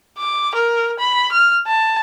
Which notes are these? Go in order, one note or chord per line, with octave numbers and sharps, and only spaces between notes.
D6
A#4
B5
F6
A5